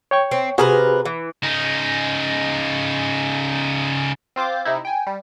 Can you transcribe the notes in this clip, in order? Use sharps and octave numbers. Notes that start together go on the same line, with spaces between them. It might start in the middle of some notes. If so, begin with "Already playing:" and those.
C#5 G5 C#6
C4
C3 F#4 G#4 A#4 B4
E3
C#3 D#4
C4 F4 C5 D6
C3 D#4 E4
G5 G#5
G3